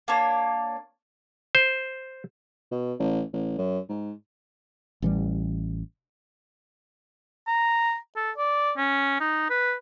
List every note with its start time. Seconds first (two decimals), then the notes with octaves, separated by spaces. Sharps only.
0.08 A#3 D4 C#5
1.55 C5
2.71 B2
2.99 A1
3.33 A1
3.58 F#2
3.89 G#2
5.02 A1 E3 G3
7.47 A#5
8.16 A4
8.37 D5
8.77 C#4
9.20 D#4
9.50 B4